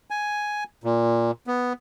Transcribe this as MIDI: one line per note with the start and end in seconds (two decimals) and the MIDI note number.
0.10 0.64 80
0.84 1.31 46
1.47 1.73 59